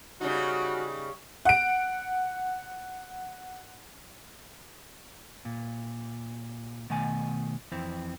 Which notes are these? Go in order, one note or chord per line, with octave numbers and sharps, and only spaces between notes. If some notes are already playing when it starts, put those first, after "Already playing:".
C#3 G3 D#4 F#4
F#5 D7
A#2
B2 D#3 A3 G#5
F2 E3 C4